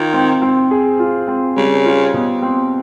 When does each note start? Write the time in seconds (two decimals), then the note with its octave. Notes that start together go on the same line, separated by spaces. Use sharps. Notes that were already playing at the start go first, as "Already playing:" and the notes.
Already playing: D#3 F4
0.14 C4
0.42 C4
0.71 G#4
0.99 F4
1.28 C4
1.56 C#3 G3
1.85 F4
2.14 B2
2.42 C4